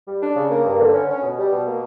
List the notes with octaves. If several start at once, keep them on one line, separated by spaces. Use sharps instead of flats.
G3
D4
C#3
A#3
G2
D3
C#4
C#4
B2
G3
B2
A#3